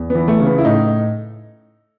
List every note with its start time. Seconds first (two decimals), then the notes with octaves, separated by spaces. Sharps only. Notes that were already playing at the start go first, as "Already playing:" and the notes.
Already playing: E2
0.10 E3 B3
0.28 A3
0.40 C#3
0.46 B3
0.58 E4
0.64 A2 D#4